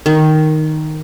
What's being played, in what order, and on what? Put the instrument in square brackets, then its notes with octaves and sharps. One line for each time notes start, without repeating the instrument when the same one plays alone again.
[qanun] D#3